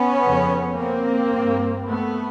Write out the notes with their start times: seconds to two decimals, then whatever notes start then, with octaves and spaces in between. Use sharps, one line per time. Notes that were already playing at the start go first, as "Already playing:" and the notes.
Already playing: B3 C#4
0.23 F2 C#3
0.77 A#3 C4
1.31 G2
1.86 A3 B3